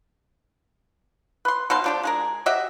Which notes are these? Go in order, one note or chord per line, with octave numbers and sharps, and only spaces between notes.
B4 C6
B2 D#4 F5 C6
F3 D4 G4
G#3 G#4 A#4
F#4 G4 D#5 E5